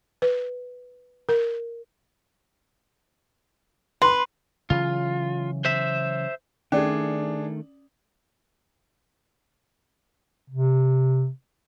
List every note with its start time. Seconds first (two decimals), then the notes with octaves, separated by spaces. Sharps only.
0.22 B4
1.29 A#4
4.02 B4 C6
4.70 C#3 E3 F#3 F4
5.65 C5 E5
6.72 D#3 A3 C#4 D4 G#4 D5
10.50 C3